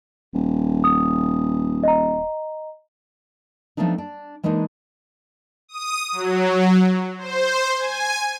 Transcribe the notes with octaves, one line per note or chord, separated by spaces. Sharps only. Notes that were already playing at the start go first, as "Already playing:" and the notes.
D#1
D#6
D#5 A#5
F3 A3 B3 C4 D4 D#4
D4
E3 G#3 A#3 D4 D#4
D#6
F#3
C5
G#5